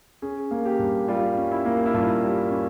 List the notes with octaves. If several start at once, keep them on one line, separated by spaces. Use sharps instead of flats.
C#4 G#4
A#3
G4
G2
G3 F4
C#4
E4
A#3
E4
G2 F4
G3
C#4